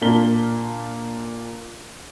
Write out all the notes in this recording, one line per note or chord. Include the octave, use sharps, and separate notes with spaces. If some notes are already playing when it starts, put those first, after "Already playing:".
A#2 A#3 D4 B6 G7